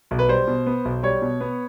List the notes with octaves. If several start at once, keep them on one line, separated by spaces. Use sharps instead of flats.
B1
B4
G3 C5
B2
B3
B1
G3 C#5
B2
B3